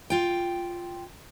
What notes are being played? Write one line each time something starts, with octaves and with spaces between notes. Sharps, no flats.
F4 G5